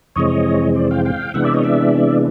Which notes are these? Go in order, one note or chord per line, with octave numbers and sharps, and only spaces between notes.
F2 C3 E3 G#3 C4 C#5 D#5
C5 D5
F5 G5
F5 G5
C3 E3 G#3 B3 D4 E5 F#5
D5 E5
C#5 D#5
D5 E5